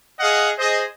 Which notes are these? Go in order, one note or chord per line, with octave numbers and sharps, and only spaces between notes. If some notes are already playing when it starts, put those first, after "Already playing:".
G#4 D#5 F5 F#5
G#4 C5 D#5